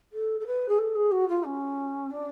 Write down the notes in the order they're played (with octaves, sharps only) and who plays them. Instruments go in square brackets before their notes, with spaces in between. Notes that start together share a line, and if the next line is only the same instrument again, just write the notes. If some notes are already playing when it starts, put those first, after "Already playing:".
[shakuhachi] A4
A4
B4
G#4
A4
G#4
F#4
F4
C#4
D4